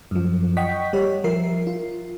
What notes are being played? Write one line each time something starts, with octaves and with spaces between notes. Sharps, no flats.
F#2 F3
D#5 F#5 G5 C#6 B6
G3 G4 C#5
F3 A#4 E5 C7
F4